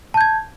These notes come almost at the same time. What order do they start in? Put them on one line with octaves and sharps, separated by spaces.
A5 G6 G#6